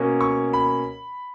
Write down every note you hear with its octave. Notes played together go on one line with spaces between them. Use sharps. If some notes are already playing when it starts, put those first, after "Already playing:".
Already playing: B2 A#3 C#4
C#6
B5